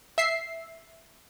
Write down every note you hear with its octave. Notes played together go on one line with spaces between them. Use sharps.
E5 C7